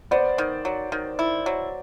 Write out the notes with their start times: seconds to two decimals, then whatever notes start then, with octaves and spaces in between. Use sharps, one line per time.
0.11 B3 C5 D5
0.38 D#3
0.65 F#3
0.92 D#3
1.19 E4
1.46 F#3